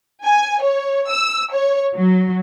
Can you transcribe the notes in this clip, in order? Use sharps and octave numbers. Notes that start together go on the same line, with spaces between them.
G#5
C#5
E6
C#5
F#3